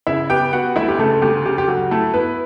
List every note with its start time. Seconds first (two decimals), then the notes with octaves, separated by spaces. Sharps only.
0.07 C#3 E4 E5
0.30 B3 G4 G5
0.53 B3 F#4 F#5
0.76 D2 E4 E5
0.88 G4
0.98 C#3 A3 A4
1.22 D2 G4
1.45 C#3 G4
1.58 G4
1.68 F#3 F#4
1.91 A3 E4 A4
2.14 B3 E4 B4